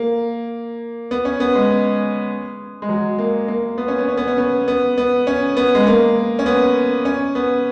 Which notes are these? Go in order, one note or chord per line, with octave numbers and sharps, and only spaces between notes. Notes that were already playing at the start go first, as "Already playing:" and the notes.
Already playing: A#3
B3
C#4
B3
G#3
G#3
F#3
A#3
A#3
B3
C#4
B3
C#4
B3
C#4
B3
B3
B3
C#4
B3
G#3
A#3
C#4
B3
C#4
B3